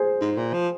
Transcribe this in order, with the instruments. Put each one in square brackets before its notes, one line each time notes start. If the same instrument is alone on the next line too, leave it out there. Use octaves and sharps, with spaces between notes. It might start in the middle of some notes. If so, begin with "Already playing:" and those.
Already playing: [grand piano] G#4 C5
[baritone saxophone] G#2
A#2
F3